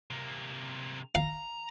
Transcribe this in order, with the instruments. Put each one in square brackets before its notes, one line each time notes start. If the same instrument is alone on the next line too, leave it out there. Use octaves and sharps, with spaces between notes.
[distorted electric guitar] C3 A#3
[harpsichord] F5 [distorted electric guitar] A#5